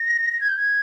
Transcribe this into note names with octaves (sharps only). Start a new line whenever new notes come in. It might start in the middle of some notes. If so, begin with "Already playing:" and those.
Already playing: A#6
A#6
G#6
G6
G#6